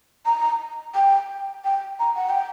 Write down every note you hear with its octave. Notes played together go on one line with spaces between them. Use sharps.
A#5
G5
G5
A#5
F#5
G5